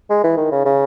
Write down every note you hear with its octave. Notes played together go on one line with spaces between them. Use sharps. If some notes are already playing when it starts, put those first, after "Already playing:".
G#3
E3
D#3
C#3
C#3